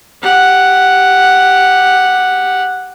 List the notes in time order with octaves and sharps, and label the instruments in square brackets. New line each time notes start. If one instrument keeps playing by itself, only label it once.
[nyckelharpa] G4 F#5